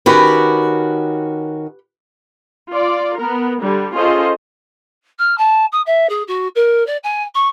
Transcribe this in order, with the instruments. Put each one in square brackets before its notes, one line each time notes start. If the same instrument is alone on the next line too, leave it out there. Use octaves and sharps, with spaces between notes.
[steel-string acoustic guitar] D#3 C#4 F#4 [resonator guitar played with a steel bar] G4 B4
[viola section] F4 D5
B3 A#4
D3 G3
C#4 F4 G#4 A4 C5 D#5
[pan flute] F6
A5
D#6
E5
G#4
F#4
A#4
D5
G#5
C#6